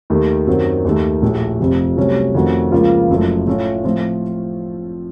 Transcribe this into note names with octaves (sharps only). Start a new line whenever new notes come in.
D#2 D#3 A3
F#2 D#3 F#3 C4 F#4
D#2 D#3 A3
A#1 A2 A3
F1 F2 C3
C2 C3 F#3 A3 C#4
F2 D#3 A3 C#4 F#4
C#2 C#3 F3 A#3 F4
F#1 F#2 F3 A3
A2 A3 C#4 F4
A2 F3 C4 F4